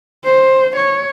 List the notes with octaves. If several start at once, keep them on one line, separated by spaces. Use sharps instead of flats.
C5
C#5